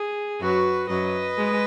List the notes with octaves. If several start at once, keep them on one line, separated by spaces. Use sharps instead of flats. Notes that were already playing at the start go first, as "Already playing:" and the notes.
Already playing: G#4
F#2 F#3 F#4 B4
F#2 F#3 B4 D#5
G#3